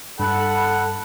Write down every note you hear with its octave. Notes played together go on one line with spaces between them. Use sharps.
G2 A4 F#5 B5